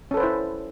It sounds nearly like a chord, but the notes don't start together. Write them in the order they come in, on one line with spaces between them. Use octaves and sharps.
C#4 A4 B4 C5 E4